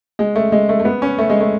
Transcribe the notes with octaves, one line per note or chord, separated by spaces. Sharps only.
G#3
A3
G#3
A3
A3
B3
C#4
A3
G#3
A3